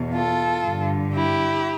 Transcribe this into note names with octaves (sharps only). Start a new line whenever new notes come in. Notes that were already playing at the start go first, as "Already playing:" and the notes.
Already playing: E2 B2
F4 A4
G2 D3
E4 G4